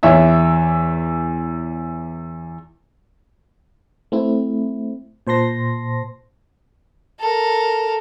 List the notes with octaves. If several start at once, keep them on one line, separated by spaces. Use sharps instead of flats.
E2 C#5 E5 E6
A3 C4 E4
A#2 C5 A5 C6 A#6
A4 A#4